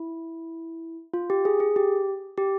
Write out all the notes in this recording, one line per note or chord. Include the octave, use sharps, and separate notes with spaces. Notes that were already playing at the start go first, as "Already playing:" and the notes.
Already playing: E4
F4
G4
G#4
G#4
G4
G4